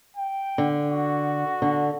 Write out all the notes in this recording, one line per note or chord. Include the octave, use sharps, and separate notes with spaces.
G5
D3
F#4
D3